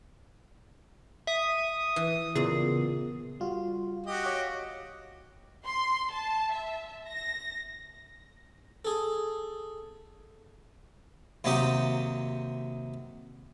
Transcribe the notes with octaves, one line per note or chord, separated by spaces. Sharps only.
E5 D#6
E3
E2 A#2 C#3 B3 F4 G#4
G3 F4 F#4
F#4 G4 D#5
C#5 F5 D6
C6
A5
E5
A#6
G#4 A4
D#2 C3 F#3 D#4 G4 D#5